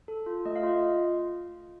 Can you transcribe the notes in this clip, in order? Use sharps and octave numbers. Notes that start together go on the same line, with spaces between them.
A4
F4
A3 D#5
F5
F4 D#5
F4